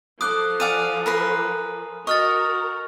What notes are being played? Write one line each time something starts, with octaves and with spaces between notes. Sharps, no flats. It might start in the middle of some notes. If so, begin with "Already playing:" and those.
F3 A4 D6 D#6 F#6
D5 F5 F#5 G#5 D#7
A#4 B4 C6
F#4 A#4 D#5 A#5 C#6 F6 A6